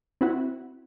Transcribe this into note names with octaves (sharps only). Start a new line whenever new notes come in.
C4 E4 F#4